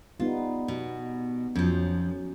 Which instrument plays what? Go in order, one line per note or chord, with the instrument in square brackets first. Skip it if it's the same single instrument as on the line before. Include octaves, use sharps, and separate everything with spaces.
[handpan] G3 B3 D#4 [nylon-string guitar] F4
[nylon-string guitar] B2
[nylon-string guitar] F2 F3 [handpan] F#3 C#4